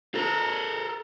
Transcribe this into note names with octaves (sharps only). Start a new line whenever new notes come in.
A4 A#4